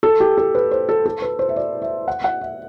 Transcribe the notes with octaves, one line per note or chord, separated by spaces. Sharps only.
A4
G4
A4
B4
C5
A4
A4
B4
C5
E5
D5
E5
F#5
F#5
E5